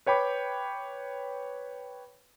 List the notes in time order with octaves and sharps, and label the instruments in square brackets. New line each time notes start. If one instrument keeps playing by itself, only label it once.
[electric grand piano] B4 C#5 G5 B5 D6